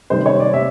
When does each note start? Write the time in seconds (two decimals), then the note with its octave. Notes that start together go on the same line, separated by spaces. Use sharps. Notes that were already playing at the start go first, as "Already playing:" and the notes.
0.10 C3 D#3 G3 C5
0.26 C#5
0.40 D5
0.53 C3 E5